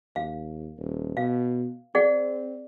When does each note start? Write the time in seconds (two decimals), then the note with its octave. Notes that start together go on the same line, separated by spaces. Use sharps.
0.16 D#2 F5
0.78 D#1
1.17 B2 F5
1.95 C4 G#4 D5 F#5